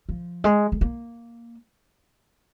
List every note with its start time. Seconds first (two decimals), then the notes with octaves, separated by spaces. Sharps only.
0.09 F3
0.44 G#3
0.72 G#3
0.81 A#3